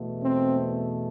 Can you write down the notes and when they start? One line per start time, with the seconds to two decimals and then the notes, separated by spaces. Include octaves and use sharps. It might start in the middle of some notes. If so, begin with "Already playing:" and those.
Already playing: E2 B2 A3
0.22 C4